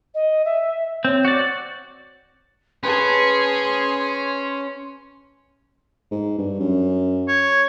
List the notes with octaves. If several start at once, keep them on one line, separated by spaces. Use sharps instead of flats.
D#5
E5
C4 C#5
F#4 D5
C#4 G#4 B4 A5 C6
G#2
G2
F#2
C#5